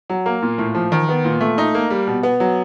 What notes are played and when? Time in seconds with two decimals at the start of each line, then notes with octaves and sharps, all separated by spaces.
0.10 F#3
0.26 A#3
0.42 A#2
0.58 A2
0.75 F3
0.92 D#3
1.09 B3
1.25 A#2
1.41 A3
1.58 D#4
1.75 A#3
1.90 G3
2.07 B2
2.23 B3
2.40 F#3